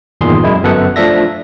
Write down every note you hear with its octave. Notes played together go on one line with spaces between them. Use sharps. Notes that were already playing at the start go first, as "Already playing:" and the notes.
G1 E2 A#2 D#3 G#4 C6
F#2 G#3 E4
G1 F#2 B3 A4 F#5
F3 A3 D4 E5 A#6